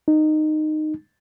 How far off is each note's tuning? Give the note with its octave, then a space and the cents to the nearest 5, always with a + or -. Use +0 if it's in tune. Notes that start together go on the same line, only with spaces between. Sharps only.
D#4 -15